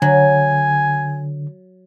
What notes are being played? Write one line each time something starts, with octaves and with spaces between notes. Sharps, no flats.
D3 F#3 G#5